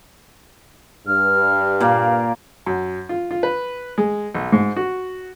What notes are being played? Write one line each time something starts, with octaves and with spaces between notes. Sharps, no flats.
G2 F6
A#2 A#3 F5
F#2
F4
F4
B4
G#3
B1
G#2
F#4